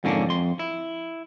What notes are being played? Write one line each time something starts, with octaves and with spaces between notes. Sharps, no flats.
F2 G#2 D3 A#3 C#4 D4
F2 C6
E4